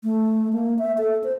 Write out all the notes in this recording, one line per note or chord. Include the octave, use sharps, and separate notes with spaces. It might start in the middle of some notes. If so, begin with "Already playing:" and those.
A3
A#3
E5
A4
C5